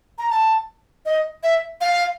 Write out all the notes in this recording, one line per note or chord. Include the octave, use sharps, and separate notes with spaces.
A#5
A5
D#5
E5
F5